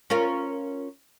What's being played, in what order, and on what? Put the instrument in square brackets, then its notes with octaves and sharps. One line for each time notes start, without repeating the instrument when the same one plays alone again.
[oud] C#4 F4 A#4